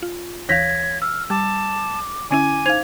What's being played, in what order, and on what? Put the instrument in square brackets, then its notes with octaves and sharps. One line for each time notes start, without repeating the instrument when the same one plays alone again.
[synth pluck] F4
[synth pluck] D2 E3 F5 [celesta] C#5 A#6 B6 [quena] G#6
[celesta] E6 [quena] F6
[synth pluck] G3 [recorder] A5 [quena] D6
[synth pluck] D3 C#4 E4 [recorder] G#5 [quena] D6
[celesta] D#4 G#6 F7 [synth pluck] C5 F5